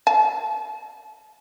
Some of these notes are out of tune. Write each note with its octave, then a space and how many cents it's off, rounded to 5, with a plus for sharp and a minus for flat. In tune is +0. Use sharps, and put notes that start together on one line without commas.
A5 -40